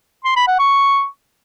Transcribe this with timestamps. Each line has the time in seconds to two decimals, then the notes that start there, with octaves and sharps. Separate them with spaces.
0.25 C6
0.36 B5
0.48 F#5
0.59 C#6